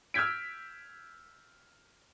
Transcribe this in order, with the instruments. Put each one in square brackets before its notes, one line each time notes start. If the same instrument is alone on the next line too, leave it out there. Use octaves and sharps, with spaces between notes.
[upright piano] E6 F6 G6 G#6 B6 D7